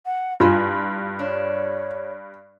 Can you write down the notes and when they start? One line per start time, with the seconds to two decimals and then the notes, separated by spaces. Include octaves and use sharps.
0.05 F#5
0.40 G2 B2 E4 F4 G#5 B5
1.19 D4 C#5